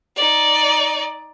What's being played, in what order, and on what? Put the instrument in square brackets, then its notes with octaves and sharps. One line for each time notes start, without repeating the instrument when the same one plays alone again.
[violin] D#4 D5